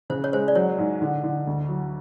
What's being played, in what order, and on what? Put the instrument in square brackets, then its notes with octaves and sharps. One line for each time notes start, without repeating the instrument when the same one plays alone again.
[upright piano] C#3 [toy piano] C5
[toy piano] C#5
[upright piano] G#3 [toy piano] C5
[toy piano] D5
[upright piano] F#3 [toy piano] C#5
[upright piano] G#2
D3
D3
D2
F#3